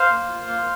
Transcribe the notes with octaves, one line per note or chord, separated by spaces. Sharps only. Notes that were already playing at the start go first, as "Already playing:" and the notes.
Already playing: C5 F5
A#3
F4
A#3